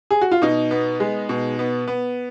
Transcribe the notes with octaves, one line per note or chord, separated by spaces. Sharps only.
G#4
F#4
F4
B2 D#4
B3
G#3
B2
B3
B3